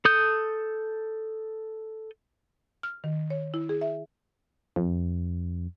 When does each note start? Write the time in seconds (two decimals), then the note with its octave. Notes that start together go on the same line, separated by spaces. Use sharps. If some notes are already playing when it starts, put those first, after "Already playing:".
0.05 A4 D#6 G6
2.83 F6
3.04 D#3
3.30 C#5
3.54 E4
3.69 G#4
3.81 E5
4.76 F2